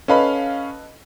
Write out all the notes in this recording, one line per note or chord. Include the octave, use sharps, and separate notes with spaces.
C#4 A4 B4 D#5 F5 B5